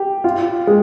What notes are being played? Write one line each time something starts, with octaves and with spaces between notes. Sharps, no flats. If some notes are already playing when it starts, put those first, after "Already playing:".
Already playing: G4
F4
G#3